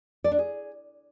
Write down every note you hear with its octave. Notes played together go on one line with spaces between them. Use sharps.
D5
D4
G#4